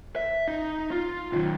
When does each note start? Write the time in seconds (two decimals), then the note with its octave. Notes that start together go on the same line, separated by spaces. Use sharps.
0.16 E5
0.48 D#4
0.91 F4
1.32 B1 D#3